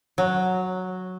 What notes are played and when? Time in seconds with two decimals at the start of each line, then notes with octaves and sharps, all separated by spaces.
0.18 F#3